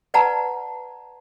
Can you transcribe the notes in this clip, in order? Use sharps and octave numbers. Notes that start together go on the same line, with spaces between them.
B4 D5 F#5 A5 A#5